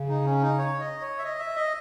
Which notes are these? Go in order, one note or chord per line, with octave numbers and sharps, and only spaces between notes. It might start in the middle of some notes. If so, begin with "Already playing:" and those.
Already playing: C#3
D#4
C#4
D#4
C#5
D#5
C#5
E5
D#5
E5
D#5